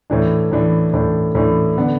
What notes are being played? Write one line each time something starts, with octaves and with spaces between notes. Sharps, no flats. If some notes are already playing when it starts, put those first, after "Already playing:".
A2 E3 D4
A2 E3 D4
A2 E3 D4
A2 E3 D4
D3 B3 D4